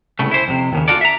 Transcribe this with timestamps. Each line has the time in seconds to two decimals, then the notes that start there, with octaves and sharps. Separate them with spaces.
0.19 C2 A2 C#3 A3
0.31 E4 C5
0.48 F2 C3
0.73 D#2 A2 C#3
0.88 F4 F#4 A4 D5
1.01 E5 A#5